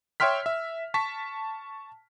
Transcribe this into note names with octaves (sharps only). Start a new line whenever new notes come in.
C#5 E5 G5 C6 F6 B6
E5
A5 C#6 B6